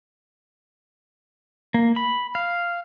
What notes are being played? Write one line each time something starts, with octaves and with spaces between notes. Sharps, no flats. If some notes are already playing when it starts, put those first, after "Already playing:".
A#3
B5
F5